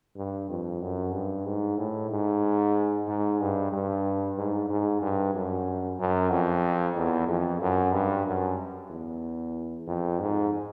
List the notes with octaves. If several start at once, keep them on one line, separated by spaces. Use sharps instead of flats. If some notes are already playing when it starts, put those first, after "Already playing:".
G2
F2
F#2
G2
G#2
A2
G#2
G#2
G2
G2
G#2
G#2
G2
F#2
F#2
F2
E2
F2
F#2
G2
F#2
E2
F2
G#2